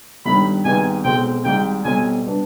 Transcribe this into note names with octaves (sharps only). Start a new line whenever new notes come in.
G1 G2 D#3 G3 B5
G#1 G#2 D#3 G3 B3 G#5
B1 B2 G#3 C4 G5
G#1 G#2 G3 G5
B1 B2 G3 C4 G#5
G3 B3 D4